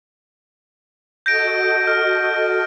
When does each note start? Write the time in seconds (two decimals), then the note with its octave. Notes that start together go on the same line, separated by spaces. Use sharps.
1.26 F#4 A4 D#5 G6 A#6 D7
1.87 F6